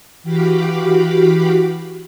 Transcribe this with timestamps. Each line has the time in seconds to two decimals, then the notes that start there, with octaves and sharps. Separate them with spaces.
0.23 E3 F#4 G4 F5 B5 D6